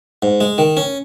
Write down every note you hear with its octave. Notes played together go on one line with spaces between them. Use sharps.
G#2
G#3
D#3
C#4